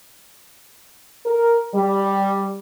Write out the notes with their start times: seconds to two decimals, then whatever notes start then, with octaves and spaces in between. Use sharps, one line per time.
1.26 A#4
1.74 G3